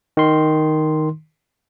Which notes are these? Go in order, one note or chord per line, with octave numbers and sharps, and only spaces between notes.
D#3 C6